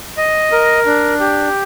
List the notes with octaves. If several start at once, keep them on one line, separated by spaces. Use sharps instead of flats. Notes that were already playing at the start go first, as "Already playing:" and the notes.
D#5
A#4
D4
G4